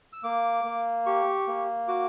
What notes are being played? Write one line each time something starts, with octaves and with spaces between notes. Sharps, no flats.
E6
A#3 D6
A#3
G4 C#6
A#3
F#4 D6